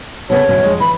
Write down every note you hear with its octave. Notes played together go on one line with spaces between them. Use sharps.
C#3 B3 A4 C#5
F#2 B2 D3
F2 G#3 D#5
E3 B5